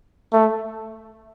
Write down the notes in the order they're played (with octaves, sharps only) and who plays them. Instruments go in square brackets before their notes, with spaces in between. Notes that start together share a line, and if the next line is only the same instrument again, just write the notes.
[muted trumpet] A3